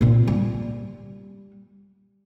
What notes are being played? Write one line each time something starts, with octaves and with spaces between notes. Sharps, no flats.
A#2 C4
G3